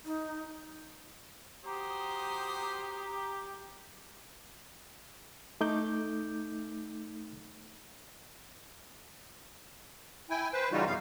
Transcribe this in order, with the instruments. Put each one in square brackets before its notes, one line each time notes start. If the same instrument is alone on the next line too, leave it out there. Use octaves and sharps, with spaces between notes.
[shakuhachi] D#4
[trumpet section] F#4 C5 D#6 [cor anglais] G4 [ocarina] A#5
[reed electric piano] A3 D#4 D6 G6
[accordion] E4 G5 G#5
B4 C5
C#3 E3 G3 D#4 F4 F#4
F#2 C3 B3 F5